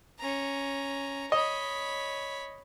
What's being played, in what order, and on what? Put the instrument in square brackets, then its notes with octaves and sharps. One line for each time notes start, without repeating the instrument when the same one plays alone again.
[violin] C#4 A#5
[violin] C#5 B5 [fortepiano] D#5